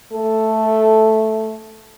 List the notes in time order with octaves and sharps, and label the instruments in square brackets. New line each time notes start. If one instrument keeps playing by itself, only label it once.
[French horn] A3 [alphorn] A4